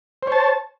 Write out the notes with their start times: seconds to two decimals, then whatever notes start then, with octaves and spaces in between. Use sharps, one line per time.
0.23 C5
0.27 C#5
0.32 A5